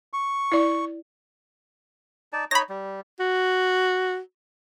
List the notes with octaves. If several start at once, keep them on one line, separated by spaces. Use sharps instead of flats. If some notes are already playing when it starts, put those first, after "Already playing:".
C#6
E4 D5
D#4 D5 A5
D#4 C#5 D#5 B5 A#6
G3
F#4